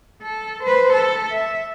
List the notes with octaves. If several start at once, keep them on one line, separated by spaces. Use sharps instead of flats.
A4
B4 C5
A4
E5